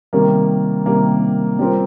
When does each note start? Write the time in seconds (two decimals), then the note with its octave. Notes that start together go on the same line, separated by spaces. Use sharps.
0.13 C3 D#3 G3 A#3
0.86 C3 D#3 G3 A#3
1.59 G3 C4 F4 A#4